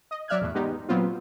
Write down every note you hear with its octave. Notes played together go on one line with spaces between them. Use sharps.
D#5
F#3 D5 E5 F6 F#6 G#6
E2 A2
G#3 B3 D#4 G4
A#2 F#3 B3 C4 F4